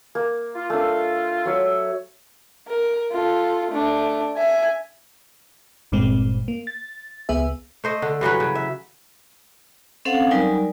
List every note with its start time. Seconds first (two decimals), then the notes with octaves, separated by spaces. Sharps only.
0.15 A#3
0.56 F4
0.70 A3 D4
1.46 F#3 C#5 E5
2.68 A#4
3.12 F4 A4
3.71 A3 D4
4.38 E5 G#5
5.92 G1 G2 A#2 G#3 C4
6.48 A#3
6.67 A6
7.29 C#2 B3 G#4 E5
7.84 A3 C5 D#5
8.02 D3
8.21 G2 E3 F#3 B4
8.40 C#3
8.55 E5
10.05 C4 C#4 A4 C5 F5 F#5
10.31 F#3 G3 D#4 A#4 D5 G#5